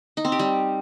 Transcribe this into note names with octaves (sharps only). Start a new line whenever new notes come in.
D#4
C4
G4
G3